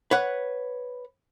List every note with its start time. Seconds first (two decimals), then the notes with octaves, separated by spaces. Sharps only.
0.11 B4 C#5 F#5